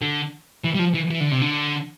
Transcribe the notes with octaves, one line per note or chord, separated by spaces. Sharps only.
D3
E3
G3
F3
E3
E3
D3
C3
D3